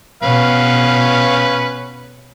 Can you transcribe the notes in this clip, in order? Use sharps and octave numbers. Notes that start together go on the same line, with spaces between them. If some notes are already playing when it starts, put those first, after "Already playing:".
B2 C#4 B4 F5